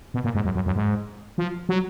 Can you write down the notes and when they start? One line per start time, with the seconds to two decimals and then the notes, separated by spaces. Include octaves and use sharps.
0.14 B2
0.24 A#2
0.35 G#2
0.45 F#2
0.55 F#2
0.66 F#2
0.76 G#2
1.38 F3
1.69 F#3